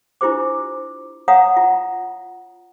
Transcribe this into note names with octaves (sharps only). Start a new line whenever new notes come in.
D4 E4 F4 G4 C5 D6
C#5 F5 F#5 A#5 D#6
F4